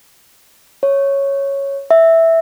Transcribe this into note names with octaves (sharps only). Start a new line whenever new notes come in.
C#5
E5